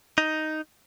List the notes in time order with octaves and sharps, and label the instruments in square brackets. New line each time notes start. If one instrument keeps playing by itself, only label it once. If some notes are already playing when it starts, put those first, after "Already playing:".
[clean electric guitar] D#4